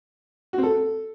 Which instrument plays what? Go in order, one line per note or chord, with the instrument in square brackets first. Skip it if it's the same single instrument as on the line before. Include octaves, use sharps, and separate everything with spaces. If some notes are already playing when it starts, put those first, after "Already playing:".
[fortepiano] F#4
C4
A4